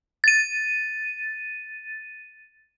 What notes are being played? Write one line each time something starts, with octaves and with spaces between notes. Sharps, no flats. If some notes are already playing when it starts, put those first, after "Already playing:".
A6 D#7